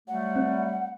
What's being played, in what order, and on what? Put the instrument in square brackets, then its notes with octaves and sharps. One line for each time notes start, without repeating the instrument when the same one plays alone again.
[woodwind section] F#3 G3 A3 [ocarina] F#5
[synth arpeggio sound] C4